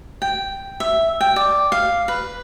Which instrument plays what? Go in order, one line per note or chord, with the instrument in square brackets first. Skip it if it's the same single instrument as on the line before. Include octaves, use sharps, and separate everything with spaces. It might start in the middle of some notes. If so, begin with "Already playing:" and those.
[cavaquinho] G5
E5
G5
D5
F5
B4